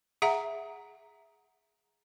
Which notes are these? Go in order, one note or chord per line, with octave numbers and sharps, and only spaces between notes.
G#4 E5 F#5 A#5